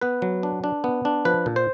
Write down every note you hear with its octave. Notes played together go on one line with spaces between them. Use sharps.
B3 B4
F#3
D4
D4
B3
D4
F3 B4
A#2
C5